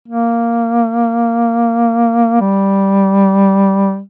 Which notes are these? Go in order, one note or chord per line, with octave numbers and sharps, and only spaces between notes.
A#3
G3